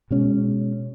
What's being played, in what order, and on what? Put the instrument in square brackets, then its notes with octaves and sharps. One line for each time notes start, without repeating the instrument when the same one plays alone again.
[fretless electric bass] B2 G#3 C#4